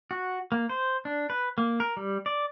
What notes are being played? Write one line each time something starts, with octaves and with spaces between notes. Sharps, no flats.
F#4
A#3
C5
D4
B4
A#3
A#4
G3
D5